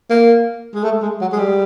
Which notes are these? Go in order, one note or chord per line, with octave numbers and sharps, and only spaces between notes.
A#3
G#3
A3
G#3
F#3
G#3
G3